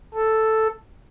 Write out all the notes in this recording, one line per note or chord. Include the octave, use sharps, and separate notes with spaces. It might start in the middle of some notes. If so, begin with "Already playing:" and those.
A4